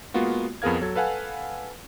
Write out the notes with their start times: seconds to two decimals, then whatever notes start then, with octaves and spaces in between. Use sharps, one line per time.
0.14 G#3 A#3 B3 F4 F#4
0.62 F2 B3 G#4 A#4 F5 G#6
0.81 F#3 A4 G#6
0.95 A4 B4 F5 F#5 G#5